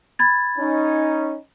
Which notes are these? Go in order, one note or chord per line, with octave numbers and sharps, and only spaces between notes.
B5 G#6 A6
C#4 D#4